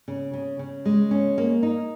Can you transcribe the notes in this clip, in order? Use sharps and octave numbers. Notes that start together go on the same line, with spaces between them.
C#3
C#3
C#3
G#3
C#4
A#3
D#4